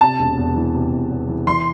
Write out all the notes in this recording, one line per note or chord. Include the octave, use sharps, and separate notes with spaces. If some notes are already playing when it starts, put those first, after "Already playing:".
C3 A5
E1
E2
E3
C3
E1
E2
E3
E3 C6